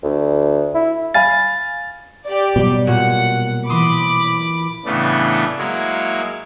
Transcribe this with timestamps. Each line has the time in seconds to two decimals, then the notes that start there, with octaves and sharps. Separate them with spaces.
0.03 D2
0.74 E4
1.14 F5 G#5 B5 A6
2.24 G4 D5
2.56 B2 F#3 G3
2.87 A#2 F#4 F#5
3.69 E3 B5 C6 D6 D#6
4.86 A2 C#3 E3 A3 B3 D4
5.58 F#3 G#3 A#3 E4 C#5